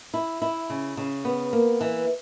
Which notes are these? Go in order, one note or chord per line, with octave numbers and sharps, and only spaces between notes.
E4
E4
C#3
C#3
B3
A#3
E3